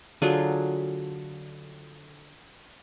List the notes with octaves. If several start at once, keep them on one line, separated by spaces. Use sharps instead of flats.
D3 F#3 F4 G#4